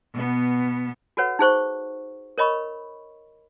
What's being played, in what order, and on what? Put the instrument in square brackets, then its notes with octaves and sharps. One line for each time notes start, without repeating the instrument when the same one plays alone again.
[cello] B2 B3
[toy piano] F#4 A4 B4 C#5 F#5
D#4 G#4 C5 C#6
A#4 C#5 D#5 B5 C#6